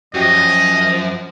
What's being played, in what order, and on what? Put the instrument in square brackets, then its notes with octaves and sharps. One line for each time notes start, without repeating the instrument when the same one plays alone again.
[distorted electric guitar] F#2 [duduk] F3 [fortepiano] F#4 G4 [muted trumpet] D#5